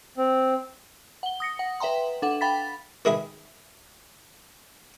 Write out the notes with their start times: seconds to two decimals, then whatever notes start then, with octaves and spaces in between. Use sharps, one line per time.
0.17 C4
1.23 F#5 G7
1.40 D#6 A#6 C#7
1.59 F#5
1.80 B4 E5 G5 A#5 C6
2.22 D4 A4 F#5
2.41 F5 G5 B5 A6 B6
3.05 D#3 E4 G#4 B5